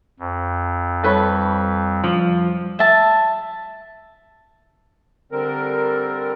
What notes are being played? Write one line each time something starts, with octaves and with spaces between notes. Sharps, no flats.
F2
G3 A4 B4 C#5
F3
E5 A5
D3 G3 C4 A#4